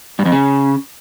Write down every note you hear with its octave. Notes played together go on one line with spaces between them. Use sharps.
G2
F2
C#3